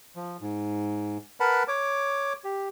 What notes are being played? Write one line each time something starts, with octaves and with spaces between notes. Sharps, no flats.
F3
G#2
A#4 B4 F#5 A5 B5
C#5 D6
G4